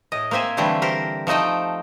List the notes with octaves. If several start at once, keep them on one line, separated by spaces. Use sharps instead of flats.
A2 D#5
A#3 C4 C5 E5 G#5
D3 E3 G3 A3 C4
G4 A#4 C5
F3 A3 D#4 D#5 G5